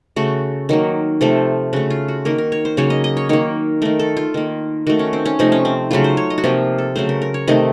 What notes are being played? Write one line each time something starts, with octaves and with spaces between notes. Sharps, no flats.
C#3 A3 F#4
D#3 F#3 A#3
C3 F3 A3 A4
C#3 A3 F#4
F4
F#4
D#3 A#3 A#4
A#4
C#5
C5
C#3 F#3 A#3 C#5
D#5
D#5
C#5
D#3 A#3 C#5
D#3 A3 A#4
A4
F4
D#3 A#3
D#3 A3 F#4
C#4
C4
C#4
C3 F3 A3 D#4
C#4
C4
C#3 F#3 A3 F4
C5
C#5
D#5
F#4
C3 F3 A#3 F4
A4
C#3 F#3 A3 C5
A#4
A#4
C#5
C3 D#3 A3 D#5